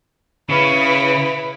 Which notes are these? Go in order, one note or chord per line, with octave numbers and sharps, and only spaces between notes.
C#3 C#4 E4 B4